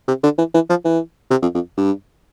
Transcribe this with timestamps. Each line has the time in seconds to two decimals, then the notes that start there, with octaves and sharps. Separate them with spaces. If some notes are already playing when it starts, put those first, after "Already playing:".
0.08 C3
0.23 D3
0.38 E3
0.55 E3
0.70 F3
0.85 E3
1.31 C3
1.42 F2
1.55 F2
1.77 G2